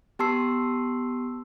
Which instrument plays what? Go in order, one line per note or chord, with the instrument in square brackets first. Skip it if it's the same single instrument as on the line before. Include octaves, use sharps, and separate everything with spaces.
[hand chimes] B3 G4 A5 C6 E6 C7